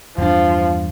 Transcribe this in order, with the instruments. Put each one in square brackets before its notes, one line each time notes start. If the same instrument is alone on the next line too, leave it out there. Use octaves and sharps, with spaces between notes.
[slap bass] E2 G2 D4 [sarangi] F3